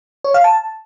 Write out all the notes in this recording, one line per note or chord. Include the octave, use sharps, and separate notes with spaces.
C#5
F5
A5